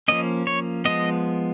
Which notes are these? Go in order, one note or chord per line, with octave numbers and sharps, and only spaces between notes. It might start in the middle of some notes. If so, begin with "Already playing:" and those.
F3 A#3 C#4 D#5
C#5
F3 G#3 B3 D#5